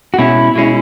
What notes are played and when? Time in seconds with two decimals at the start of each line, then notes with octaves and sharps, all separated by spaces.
0.14 F#4
0.19 B2 G#3 C#4 E4
0.56 B2 G#3 C#4